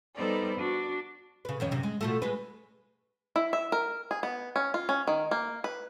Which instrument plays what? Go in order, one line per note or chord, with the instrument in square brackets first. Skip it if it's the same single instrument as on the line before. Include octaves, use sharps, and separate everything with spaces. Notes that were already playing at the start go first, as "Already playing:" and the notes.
[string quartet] G3 B3 D#4 A4 C5 D5
D4 F#4
[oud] C#3 B4
F2 D#3 C#4
F#2 C3
G#3
B2 F3 A3
G#3 G#4 B4
[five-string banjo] E4
E5
A#4
G#4
B3
C#4
F4
C#4
D#3
A#3
B4